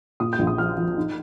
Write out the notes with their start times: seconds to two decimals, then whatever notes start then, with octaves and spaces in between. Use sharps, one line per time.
0.20 A#2 D#6
0.33 G6
0.39 A#1
0.47 D#6
0.58 F3 F6
0.77 F3
0.97 D#4